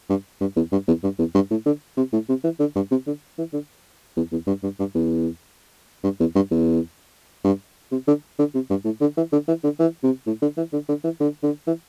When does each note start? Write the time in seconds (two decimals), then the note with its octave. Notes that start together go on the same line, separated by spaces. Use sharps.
0.10 G2
0.41 G2
0.56 E2
0.72 G2
0.87 E2
1.03 G2
1.19 E2
1.35 G2
1.51 A2
1.66 D3
1.97 C3
2.13 A2
2.29 C3
2.44 E3
2.60 D3
2.76 G2
2.91 C3
3.07 D3
3.38 E3
3.53 D3
4.16 E2
4.32 E2
4.47 G2
4.63 G2
4.79 G2
4.95 E2
6.04 G2
6.20 E2
6.35 G2
6.51 E2
7.44 G2
7.92 C3
8.07 D3
8.39 D3
8.54 C3
8.70 G2
8.85 A2
9.01 D3
9.17 E3
9.32 D3
9.48 E3
9.64 D3
9.79 E3
10.03 C3
10.27 A2
10.42 D3
10.57 E3
10.73 D3
10.89 D3
11.04 E3
11.20 D3
11.43 D3
11.67 E3